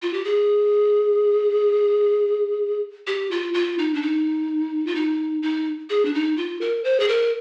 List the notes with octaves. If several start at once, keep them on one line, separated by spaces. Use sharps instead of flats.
F4
G4
G#4
G4
F4
F4
D#4
D4
D#4
F4
D#4
D#4
G#4
D4
D#4
F4
A#4
C5
G#4
A#4